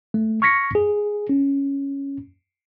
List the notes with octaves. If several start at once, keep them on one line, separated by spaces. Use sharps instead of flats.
A3
C#6 F6 G#6 A#6 B6 C#7
G#4
C#4